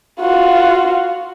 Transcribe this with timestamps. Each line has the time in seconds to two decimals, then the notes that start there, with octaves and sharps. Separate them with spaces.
0.20 F4 F#4